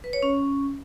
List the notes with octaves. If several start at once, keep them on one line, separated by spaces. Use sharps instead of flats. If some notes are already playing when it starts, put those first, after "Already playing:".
B4
C#5
C#4